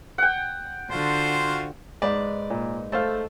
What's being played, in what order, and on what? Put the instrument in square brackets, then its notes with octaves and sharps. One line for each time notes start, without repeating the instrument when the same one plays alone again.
[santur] F#5 G5
[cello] D3 [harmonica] F4 F#4 C5
[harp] G#2 B4 [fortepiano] D5
[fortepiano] A#2
[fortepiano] A3 C5 F5 [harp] A4